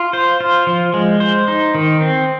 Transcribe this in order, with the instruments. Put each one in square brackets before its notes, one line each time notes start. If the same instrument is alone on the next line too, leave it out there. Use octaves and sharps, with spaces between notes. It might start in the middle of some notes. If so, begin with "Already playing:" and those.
Already playing: [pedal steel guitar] F4
C5
F4
F3
G#3
C5
D#4
D#3
C4